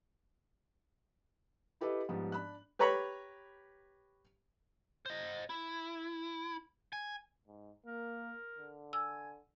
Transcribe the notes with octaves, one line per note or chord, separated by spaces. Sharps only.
E4 G4 A4 B4 D#5
G#2 F3 G3 B3
D4 B5 F#6
G4 B4 C#5 A#5 B5 C#6
C5 D#5
E4
G#5
G#2
A#3 A#4
D3
G#5 E6